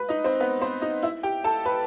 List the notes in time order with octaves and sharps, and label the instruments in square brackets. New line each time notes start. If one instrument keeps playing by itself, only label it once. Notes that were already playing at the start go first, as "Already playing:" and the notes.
Already playing: [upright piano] B4 B5
D#4 D#5
C4 C5
B3 B4
C4 C5
D#4 D#5
E4 E5
G4 G5
A4 A5
B4 B5